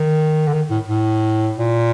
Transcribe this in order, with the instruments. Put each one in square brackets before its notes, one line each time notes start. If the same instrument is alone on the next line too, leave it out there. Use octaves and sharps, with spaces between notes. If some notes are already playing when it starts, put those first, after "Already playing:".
Already playing: [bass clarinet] D#3
D3
D#3
A2
A2
A#2